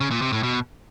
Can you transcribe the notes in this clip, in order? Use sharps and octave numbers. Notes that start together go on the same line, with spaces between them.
C#3
A#2
C3
A2
B2